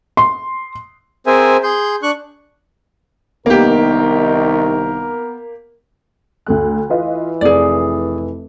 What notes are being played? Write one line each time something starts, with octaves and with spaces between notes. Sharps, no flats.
C6
C4 G#4 A#4 C5 E5 G#5
G#4 C6 G6
D4 C#6 F#6
C2 D#3 A#3 B3 D#4 G4 A#4
D2 A3 F#6
E3 F4 B4 D#5
F1 G#4 D5